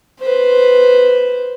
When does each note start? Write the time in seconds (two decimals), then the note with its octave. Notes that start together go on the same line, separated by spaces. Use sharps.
0.20 B4 C5